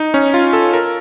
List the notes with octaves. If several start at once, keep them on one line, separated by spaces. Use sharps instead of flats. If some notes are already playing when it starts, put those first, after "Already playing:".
Already playing: D#4
C#4
F4
A4
A#4